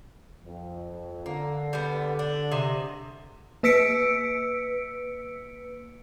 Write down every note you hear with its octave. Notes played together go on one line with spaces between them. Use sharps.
F2
D3 A#3
G3 B3
D4
C3 D#5 E5
A#3 B4 E6 B6 C#7 D7